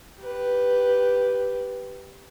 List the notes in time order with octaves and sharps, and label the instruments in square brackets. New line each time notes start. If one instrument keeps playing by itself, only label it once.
[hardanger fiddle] G4 B4